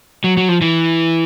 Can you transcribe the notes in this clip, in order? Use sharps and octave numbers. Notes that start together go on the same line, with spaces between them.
F#3
F#3
F3
E3